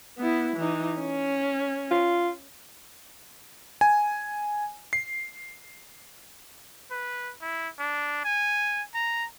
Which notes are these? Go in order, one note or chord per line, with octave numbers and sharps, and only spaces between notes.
B3 E4
E3 D#4
C#4
F4
G#5
C7
B4
E4
D4
G#5
A#5